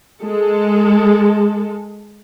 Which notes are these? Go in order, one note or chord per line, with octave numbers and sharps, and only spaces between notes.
G#3 A4